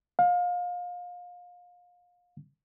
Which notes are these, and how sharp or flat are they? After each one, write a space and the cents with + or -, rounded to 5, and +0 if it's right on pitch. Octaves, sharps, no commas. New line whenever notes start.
F5 +30